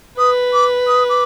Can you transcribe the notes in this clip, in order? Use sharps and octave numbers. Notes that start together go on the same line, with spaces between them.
B4 D#6
D6
D#6
D6